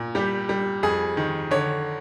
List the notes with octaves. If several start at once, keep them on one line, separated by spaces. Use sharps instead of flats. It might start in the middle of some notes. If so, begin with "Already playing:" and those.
Already playing: A#2
G3 G4
G3
F2 G#4
D#3
D3 C#5